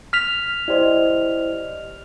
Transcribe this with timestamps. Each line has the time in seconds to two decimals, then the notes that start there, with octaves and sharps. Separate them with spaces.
0.13 F6 B6 F7
0.68 E4 G4 C5 D5 D#5